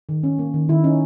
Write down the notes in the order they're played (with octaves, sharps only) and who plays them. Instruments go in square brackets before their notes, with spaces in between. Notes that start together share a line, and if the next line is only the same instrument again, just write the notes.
[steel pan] D#3
C#4
A#3
D#3
D#3 E4
C#4 D#4